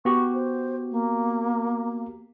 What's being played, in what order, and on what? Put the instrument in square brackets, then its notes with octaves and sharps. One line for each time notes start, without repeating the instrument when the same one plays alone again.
[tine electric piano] B3 F#4 G4 [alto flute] C#6
[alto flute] C5
A#3